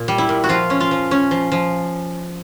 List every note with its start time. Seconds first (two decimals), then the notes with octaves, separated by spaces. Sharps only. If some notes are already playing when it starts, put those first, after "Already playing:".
Already playing: A#2
0.08 G3
0.18 E4
0.29 A#2
0.44 F#4
0.49 F3 F4
0.70 C#4
0.80 F4
0.91 F3
1.11 C#4
1.31 F3
1.52 F3